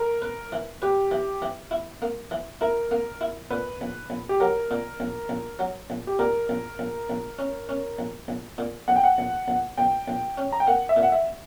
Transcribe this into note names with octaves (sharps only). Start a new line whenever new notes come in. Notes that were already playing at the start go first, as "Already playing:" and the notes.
Already playing: A#4
B4
E3
G4 B4
E3
E3
E4
A#3
E3
E4 A#4
A#3
E4
A#2 B4
A#1
A#1
G4
F#3 A#4
A#2
A#1
A#1
F#3
A#1
G4
A#2 A#4
A#1
A#1
A#1
C#4
C#4
A#1
A#1
A#2
A#1 F#5
G5
F#5
A#1
A#1
A#1 G5
A#1
C#4
A#5
G5
A#3 F#5
E5
A#2
F#5
E5